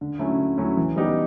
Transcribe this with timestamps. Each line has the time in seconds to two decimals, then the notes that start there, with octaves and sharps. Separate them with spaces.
0.01 D3
0.19 F#3 A3 C#4 E4
0.38 D3
0.58 F#3 A3 C#4 E4
0.77 E3
0.96 G3 B3 D#4 G4